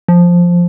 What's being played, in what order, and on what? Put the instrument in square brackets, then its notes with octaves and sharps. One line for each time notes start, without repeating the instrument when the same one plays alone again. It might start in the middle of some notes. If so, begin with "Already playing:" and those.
[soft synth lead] F3